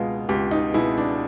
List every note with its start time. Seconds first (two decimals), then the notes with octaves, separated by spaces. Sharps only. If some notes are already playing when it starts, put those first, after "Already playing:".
Already playing: C#2 B2 G#3 F4
0.29 C#2 G4
0.51 D#4
0.74 B2 G#3 E4
0.98 D4